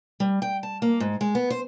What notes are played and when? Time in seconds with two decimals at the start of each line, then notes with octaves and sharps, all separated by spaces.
0.20 G3
0.42 G5
0.63 A5
0.82 A#3
1.00 G#2
1.21 G#3
1.35 B3
1.50 C5